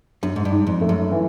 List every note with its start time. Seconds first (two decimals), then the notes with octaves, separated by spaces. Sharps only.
0.23 F#2 D4
0.36 G#2
0.45 G2
0.52 G#2
0.67 F2
0.81 A3
0.89 F#2
1.12 E3